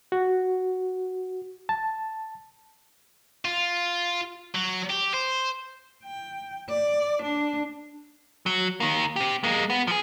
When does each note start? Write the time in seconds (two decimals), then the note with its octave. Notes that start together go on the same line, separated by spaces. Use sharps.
0.12 F#4
1.69 A5
3.45 F4
4.55 F#3
4.90 G4
5.14 C5
6.04 G5
6.69 D5
7.22 D4
8.46 F#3
8.80 D#3 A#3
9.16 C4 G4
9.44 G#3 A#3
9.70 B3
9.87 F3 G#4